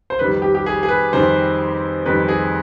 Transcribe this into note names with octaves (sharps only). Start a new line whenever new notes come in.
C5
F2 D#3 G3 B4
G4
G4
G#4
G#4
B4
F2 D#3 G3 C5
F2 D#3 G3 B4
G#4